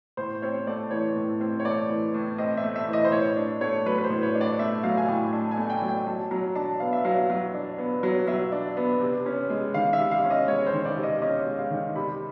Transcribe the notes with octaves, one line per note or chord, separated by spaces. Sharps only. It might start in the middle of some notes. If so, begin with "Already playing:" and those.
A2 C5
C4 C#5
A3 D5
E3 C#5
A2
C4
C#5
A3 D5
E3
A2
C4 D#5
E5
A3
E5
E3
D#5
C5
A2 C#5
D4
A3 C#5
F#3 B4
B4
C5
A2
C#5
D4
D5
A3 E5
F#3 F5
G#5
A2 G5
D4 A5
G#5
A3
G5
F#3
G5
F#3 A5
F#3 A#5
D4 A5
B3 F5
E5
F#3 F5
F#3
D4
B3
F#3
F#3 E5
D4
B3
C3
C#4
G#3
D#3 F5
E5
C3
F5
C#4
D#5
G#3 C#5
C5
D#3
D5
C3
D#5
C#4 D#5
G#3
F5
D#3
C3 B5